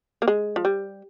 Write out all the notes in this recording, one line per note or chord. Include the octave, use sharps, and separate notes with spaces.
A#3
G#3
F3
G3